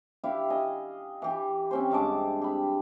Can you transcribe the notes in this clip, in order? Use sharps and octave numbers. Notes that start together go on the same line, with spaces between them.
E4 G4 E5 F5
D#5 G#5
E3 G4
C4 C#4 C5
G2 G#3 A5 D6
G4 B5